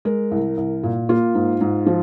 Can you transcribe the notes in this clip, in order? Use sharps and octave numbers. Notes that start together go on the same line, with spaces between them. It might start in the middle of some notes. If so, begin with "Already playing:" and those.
G#3 A#4
C2
C2
A#2
A#3 F4
G#2
G#2
F3